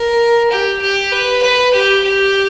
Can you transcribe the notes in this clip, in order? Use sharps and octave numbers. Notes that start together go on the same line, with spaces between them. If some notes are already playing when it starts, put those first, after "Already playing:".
Already playing: A#4
G4
G4
B4
B4
G4
G4